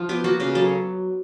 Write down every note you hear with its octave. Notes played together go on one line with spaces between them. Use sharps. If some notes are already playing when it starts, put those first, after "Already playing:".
Already playing: F3
B3 G4
A#3 F#4
C#3 G4
F#3 A4